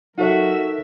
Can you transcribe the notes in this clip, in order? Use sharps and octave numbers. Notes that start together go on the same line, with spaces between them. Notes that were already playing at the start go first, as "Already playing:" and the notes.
F#3 D#4 F#4 A4 A#4 C#5 E5